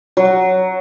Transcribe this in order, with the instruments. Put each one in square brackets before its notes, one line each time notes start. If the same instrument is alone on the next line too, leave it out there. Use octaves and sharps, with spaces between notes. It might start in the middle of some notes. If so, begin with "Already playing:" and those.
[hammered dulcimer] F#3